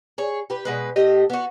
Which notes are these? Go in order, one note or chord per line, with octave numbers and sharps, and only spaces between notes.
G#4 C#5
G4 B4
B2 G#3 B4
A2 A3 G4 D#5
B3 F#4